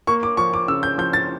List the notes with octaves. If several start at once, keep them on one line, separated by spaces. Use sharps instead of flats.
A#3 C#6
D6
F3 C#6
D6
C#3 E6
G6
F3 G6
A6